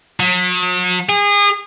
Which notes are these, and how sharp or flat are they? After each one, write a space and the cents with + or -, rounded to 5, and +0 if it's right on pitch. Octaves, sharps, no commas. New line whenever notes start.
F#3 -40
G#4 -30